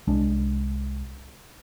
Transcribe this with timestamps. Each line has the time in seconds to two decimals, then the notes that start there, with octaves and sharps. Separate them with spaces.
0.07 C2 G#3 D4